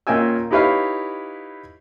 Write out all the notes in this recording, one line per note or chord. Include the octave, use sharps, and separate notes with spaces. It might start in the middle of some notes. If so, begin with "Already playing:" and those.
A#2 A#3 C#4 G5 G#5 E6
D#4 E4 G4 B4 C#5 F5